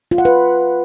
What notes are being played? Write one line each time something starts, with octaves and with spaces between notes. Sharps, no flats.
F4
F#5
B4